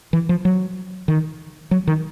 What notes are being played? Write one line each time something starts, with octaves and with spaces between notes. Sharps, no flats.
E3
F3
F#3
D#3
F#3
D#3